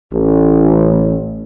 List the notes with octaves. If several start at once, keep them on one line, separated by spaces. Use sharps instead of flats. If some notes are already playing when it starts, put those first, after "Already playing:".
A1